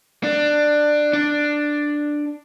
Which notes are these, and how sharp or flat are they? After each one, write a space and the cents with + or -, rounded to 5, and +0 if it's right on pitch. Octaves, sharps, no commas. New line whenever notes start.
D4 +15
D4 +5